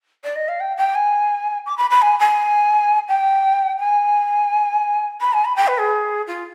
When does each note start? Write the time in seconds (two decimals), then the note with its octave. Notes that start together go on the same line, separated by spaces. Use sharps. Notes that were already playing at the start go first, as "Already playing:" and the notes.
0.24 D5
0.36 D#5
0.48 F5
0.60 G5
0.77 G5
0.95 G#5
1.66 D6
1.78 B5
1.90 B5
2.02 G#5
2.19 G#5
3.08 G5
3.79 G#5
5.21 B5
5.33 G#5
5.45 B5
5.56 G5
5.68 B4
5.79 G#4
6.27 F4